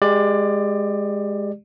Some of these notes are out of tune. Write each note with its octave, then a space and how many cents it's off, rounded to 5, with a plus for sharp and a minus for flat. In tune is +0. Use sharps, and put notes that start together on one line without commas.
G#3 -5 G4 +0 D5 +20